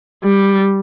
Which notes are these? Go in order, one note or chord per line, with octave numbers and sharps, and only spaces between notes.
G3